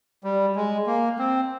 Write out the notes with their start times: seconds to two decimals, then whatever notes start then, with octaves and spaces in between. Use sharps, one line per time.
0.24 G3
0.56 G#3
0.87 A#3
1.19 C4